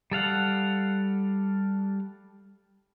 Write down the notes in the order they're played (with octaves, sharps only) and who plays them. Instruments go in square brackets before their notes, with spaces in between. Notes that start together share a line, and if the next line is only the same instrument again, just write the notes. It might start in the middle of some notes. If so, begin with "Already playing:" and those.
[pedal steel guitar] G3 A4 F5 F#5